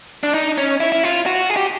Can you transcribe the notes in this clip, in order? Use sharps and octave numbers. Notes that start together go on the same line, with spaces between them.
D4
D#4
C#4
E4
E4
F4
F#4
G#4
G4